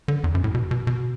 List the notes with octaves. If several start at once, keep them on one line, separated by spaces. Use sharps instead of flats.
D3
E2
F#2
A2
B2
B2
B2